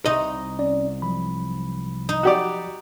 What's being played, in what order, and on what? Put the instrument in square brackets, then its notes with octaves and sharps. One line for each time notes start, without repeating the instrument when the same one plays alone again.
[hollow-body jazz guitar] C2 D#5 [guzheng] D#4
[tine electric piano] C#4 D5
F3 F#3 B5
[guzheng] D#4
[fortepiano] F#4 G4 D5